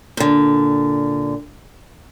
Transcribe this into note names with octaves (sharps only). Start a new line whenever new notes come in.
A#2 D3